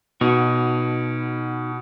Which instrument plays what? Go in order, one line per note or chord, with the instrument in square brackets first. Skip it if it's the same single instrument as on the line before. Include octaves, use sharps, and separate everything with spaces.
[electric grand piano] B2 [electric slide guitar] D#4 F#4